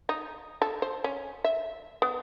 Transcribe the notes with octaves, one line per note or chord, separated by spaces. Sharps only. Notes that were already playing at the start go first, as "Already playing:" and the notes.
D#4
A4
C5
C#4
E5
B3